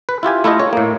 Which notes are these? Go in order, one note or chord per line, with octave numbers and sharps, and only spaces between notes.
B4
E4 F4 G4 G#5
A3 E4 F4 G4 D#5
C#5
A2 A#3